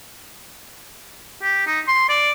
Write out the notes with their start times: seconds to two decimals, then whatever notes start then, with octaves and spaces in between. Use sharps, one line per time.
1.43 G4
1.67 D#4
1.88 C6
2.09 D5